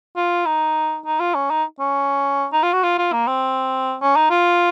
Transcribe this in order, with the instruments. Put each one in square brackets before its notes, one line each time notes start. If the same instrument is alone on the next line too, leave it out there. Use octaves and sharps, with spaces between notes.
[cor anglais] F4
D#4
D#4
F4
C#4
D#4
C#4
D#4
F4
F#4
F4
F4
A#3
C4
C#4
D#4
F4